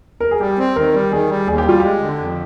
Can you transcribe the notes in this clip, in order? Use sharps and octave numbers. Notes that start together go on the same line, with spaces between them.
A#4
G#4
G3 G4
C4
D#3 A#4
G3
D#3 G#4
G3
D#2 G#4
G4
G3 F4
G#3 G4
D3
F2